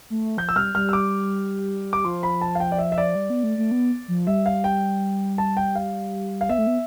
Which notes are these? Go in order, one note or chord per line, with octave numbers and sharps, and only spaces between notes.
A3
F3 G6
E6
G3 F6
G3 F6
E6
D6
D6
F3 C6
B5
A5
F5
G5
D5
E5
E5
D5
G3
B3
A3
A3
B3
F3
G3 E5
F5
G5
A5
G5
F5
F5
B3 E5
A3
B3